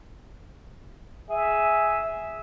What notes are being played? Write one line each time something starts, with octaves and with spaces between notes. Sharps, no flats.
G#4 E5